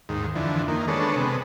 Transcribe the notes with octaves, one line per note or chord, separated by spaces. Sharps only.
D#2 G#2
F2 D3 E3
D#3 A#3
G#3 B3 D4 A4 C#5
C3 G#3 B3